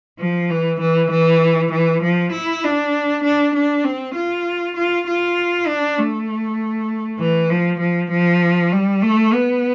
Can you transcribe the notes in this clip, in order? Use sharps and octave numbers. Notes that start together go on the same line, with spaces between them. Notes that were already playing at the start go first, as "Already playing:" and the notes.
F3
E3
E3
E3
E3
F3
E4
D4
D4
D4
C4
F4
F4
F4
D4
A3
E3
F3
F3
F3
G3
A3
B3